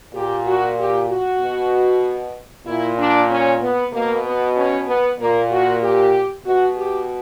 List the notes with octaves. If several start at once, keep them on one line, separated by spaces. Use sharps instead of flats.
A#2 G4
F#4
G4
F#4
B2
A#2 E4
D4
C#4
B3
B2 A#3
B3
C#4
B3
A#2 A#3
F#4
G4
B2 F#4
G4